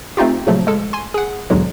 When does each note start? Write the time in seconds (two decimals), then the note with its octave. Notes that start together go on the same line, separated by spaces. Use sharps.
0.17 A3 C4 D#4 F4 G4
0.47 A#2 C#3 F3 F#3 A3
0.67 G#3 A4
0.93 G#5 C6
1.14 G#4 F#5
1.50 B1 E2 G#2 D3 F#3 G#3